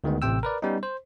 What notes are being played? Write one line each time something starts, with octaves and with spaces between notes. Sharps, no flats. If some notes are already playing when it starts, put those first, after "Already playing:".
D2 D#3 G#3 B3
A1 A2 C3 G5 E6
A#4 B4 D5
G3 B3 C#4 D#4
C5